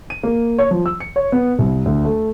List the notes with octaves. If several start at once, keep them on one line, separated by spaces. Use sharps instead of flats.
D#7
A#3
C#5
F3
E6
C#7
C#5
B3
C2
D2
A3